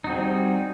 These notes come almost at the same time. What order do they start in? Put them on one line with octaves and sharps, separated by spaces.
D#4 F#4 C4 G#4 G3